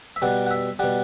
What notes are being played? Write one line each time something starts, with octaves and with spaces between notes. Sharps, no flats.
E5
B2 G3 F#5
F#5
E5
B2 G3 F#5